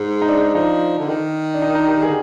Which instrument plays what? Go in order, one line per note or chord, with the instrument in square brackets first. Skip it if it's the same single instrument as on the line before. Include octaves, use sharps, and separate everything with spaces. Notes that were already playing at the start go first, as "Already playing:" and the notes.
Already playing: [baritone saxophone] G#2
[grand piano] D#4
D4
[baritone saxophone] F3 [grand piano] D#4
[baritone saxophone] D3
D#3
[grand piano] D4
D#4
D#4
G4
G#4
[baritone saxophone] D3